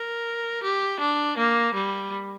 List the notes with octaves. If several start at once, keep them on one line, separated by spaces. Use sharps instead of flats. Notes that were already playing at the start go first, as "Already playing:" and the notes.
Already playing: A#4
G4
D4
A#3
G3